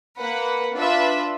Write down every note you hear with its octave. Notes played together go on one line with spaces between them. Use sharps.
A#3 B4 F#5
D4 F4 B4 E5